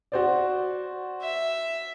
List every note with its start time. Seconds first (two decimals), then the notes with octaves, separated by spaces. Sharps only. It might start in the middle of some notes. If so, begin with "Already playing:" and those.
0.12 F#4 C5 D5
1.21 E5